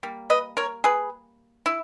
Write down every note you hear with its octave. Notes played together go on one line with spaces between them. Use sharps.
G3 A#3
B4 D#5
A#4 C#5
G#4 B4
E4